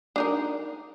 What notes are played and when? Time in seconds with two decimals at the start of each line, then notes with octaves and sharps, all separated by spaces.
0.16 D4 D#4 A#4